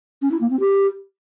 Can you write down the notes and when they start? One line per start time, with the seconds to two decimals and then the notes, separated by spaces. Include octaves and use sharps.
0.22 C#4
0.31 E4
0.41 A#3
0.50 C4
0.60 G4